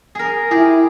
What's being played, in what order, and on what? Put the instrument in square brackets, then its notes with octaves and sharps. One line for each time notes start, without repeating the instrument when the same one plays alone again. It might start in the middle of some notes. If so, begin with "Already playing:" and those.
[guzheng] G#4 A#4
[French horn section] E4 [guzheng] G4 G#4